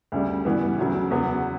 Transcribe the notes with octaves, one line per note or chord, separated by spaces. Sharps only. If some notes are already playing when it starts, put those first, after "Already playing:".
D2 C#3 G3
G2 E3 B3
D2 C#3 F#3
E2 C#3 F#3 B3